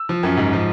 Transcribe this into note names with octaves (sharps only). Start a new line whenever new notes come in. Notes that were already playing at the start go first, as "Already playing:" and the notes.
Already playing: E6
F3
F#2
G#2
F3